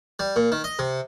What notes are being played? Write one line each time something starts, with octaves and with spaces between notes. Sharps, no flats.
G3
A#2
D#3
D#5
C3